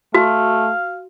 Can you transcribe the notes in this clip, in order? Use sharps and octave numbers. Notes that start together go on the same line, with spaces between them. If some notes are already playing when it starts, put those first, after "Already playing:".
A3 F#4 F5